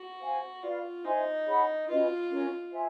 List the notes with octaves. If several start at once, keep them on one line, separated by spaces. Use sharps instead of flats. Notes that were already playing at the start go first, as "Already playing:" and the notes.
Already playing: F#4
C5 F5 G#5
F4 B4 D5 F5
D#4 C5 E5 G#5 C6
G#4 C#5 F#5 B5
C#4 F4 F#4 B4 D#5
C#4 F#4 A#4
C5 E5 G#5